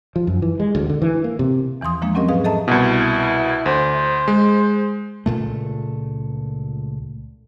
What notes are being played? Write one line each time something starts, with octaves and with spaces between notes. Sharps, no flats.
F3
F#2
E3
G#3
D2
D3
E3
A#3
C3
E2 E3 F3 C6 D#6
E3 F3 G#3 A#3 D4
F#3 C4 C#4 G4 A#4 D#5
G#2 G#4 B4 F5 D#6
A4 D#5 E5 A5 A#5
C2 B2 E4
D2 C5
G#3
C#2 A#2 A3